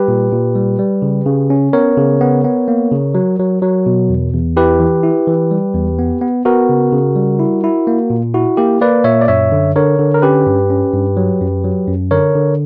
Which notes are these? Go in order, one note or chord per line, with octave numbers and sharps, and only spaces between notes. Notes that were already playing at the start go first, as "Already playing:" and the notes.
Already playing: G3 G4 B4
A#2
A#2
G3
G3
C#3
C#3
C#4
B3 A#4 C#5
C#3
B3
B3
A#3
C#3
F#3
F#3
F#3
B2
E2
E2
E4 G4 B4
E3
E4
E3
G3
E2
B3
B3
B3 F#4 A#4
C#3
C#3
G3
E4
E4
A#3
A#2
E4 F#4
A#3 G4
A#3 B4 D5
A#2 C#5 E5
D5
F#2 C#5 E5
D3
D3 A#4 C#5
D3
A#4
C#4 G4 B4
G2
C#4
G2
F#3
F#2
F#3
F#2
D3 A#4 C#5
D3